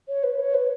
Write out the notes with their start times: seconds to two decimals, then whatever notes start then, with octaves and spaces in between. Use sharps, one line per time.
0.09 C#5
0.24 B4
0.39 C#5
0.54 B4